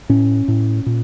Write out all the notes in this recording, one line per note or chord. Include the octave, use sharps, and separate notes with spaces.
A2 C#4
A2
A#2